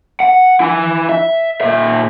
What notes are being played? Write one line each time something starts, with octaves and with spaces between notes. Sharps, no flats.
F#5
E4 G#5
E5
A#2 E5